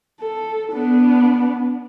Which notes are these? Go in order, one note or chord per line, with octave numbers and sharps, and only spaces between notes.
A4
B3 D4